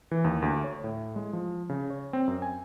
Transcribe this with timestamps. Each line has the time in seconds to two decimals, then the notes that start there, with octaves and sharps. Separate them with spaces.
0.11 E3
0.24 D#2
0.42 D2
0.64 C#5
0.84 A2
1.16 G#3
1.33 F3
1.69 C#3
1.90 C#5
2.13 C4
2.27 F#2
2.42 G#5